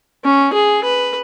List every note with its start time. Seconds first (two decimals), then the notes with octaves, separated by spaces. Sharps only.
0.24 C#4
0.53 G#4
0.84 B4